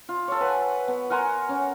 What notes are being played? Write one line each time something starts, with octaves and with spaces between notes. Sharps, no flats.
F4
A4 C#5
B4 F#5 G#5
B3
A#4 F#5 G#5 C6
C#4